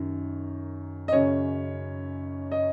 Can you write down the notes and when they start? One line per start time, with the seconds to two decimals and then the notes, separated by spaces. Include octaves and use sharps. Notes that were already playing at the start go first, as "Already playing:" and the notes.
Already playing: F#2 D#3
1.08 D#5
1.12 F#2 C#3 C#5
2.52 D#5